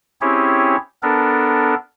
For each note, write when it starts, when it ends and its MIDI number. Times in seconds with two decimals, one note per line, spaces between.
0.21 0.76 60
0.21 0.76 61
0.21 0.76 64
0.21 0.76 67
0.21 0.76 68
0.21 0.76 73
1.03 1.75 59
1.03 1.75 62
1.03 1.75 69
1.03 1.75 70